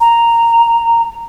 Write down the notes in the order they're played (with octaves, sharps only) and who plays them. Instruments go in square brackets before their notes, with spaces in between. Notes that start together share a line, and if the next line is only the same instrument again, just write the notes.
[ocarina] A#5